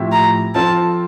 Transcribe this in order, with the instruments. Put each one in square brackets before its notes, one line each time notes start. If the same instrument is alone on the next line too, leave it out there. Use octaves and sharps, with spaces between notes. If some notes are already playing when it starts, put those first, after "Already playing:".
Already playing: [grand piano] A2 F3 C4 E4 G4
[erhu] A#5
[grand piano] F3 C4 F4 A4 [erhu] A5